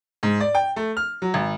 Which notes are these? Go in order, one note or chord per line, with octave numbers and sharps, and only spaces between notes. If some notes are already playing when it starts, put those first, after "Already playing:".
G#2
D5
G5
A3
F6
F#3
G#1